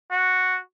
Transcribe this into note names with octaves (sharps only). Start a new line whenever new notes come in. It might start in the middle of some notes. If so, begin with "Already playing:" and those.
F#4